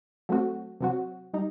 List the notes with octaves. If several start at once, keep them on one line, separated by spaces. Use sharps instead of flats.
F#3 A3 C4 F#4
C3 F#3 C4 F#4
G3 D#4